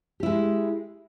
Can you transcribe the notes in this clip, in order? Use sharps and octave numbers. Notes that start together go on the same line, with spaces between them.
G#3 E4 G4